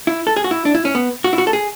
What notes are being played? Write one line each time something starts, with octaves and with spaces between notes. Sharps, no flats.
E4
A4
G#4
F#4
E4
D4
E4
C#4
B3
F#4
E4
F#4
A4
G#4